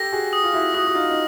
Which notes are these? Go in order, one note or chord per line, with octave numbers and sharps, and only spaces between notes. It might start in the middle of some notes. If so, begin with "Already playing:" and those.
Already playing: G4 A4 A#6
F#4 G#4
D#6
F4
E4 F#4
E4 F#4 D#6
F#4
D#4 F4
D#4